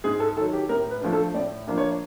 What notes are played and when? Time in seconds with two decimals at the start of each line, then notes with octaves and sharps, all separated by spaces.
0.04 G#2 G#4
0.20 A4
0.37 D#3 F#3 A4
0.53 G4
0.69 A2 A#4
0.91 B4
1.01 F3 A3 D4
1.13 A4
1.34 A2 D5
1.67 F3 A#3 D4
1.78 C#5